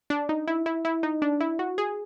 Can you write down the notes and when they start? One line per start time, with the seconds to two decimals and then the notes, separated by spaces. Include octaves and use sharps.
0.10 D4
0.29 D#4
0.48 E4
0.66 E4
0.85 E4
1.03 D#4
1.22 D4
1.40 E4
1.59 F#4
1.78 G#4